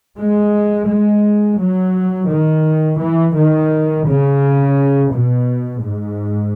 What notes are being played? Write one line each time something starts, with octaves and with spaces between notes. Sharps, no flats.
G#3
G#3
F#3
D#3
E3
D#3
C#3
B2
G#2